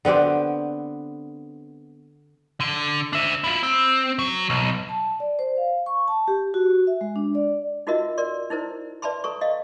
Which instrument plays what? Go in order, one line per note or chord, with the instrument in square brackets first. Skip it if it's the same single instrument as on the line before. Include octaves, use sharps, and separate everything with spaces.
[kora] D3 B3 C4 G4
[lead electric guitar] D3
D4 E5
E4 F4
C4
F#3
B1
[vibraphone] A5
D5
C5
F5
C#6
A5
G4
F#4
E5
G#3
D4
D5
[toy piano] D#4 F4 F#4 A#4 D#5 E5
A#4 D5 C6
D#4 E4 A#4 C5
B4 D5 E5 A5 B5 C6
A4 A#5 C#6
D#5 F5